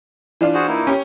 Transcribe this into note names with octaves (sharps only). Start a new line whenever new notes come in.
E3 D4 F4
F#4 G#4 C5
A#3 D#4 E4
C#4 G4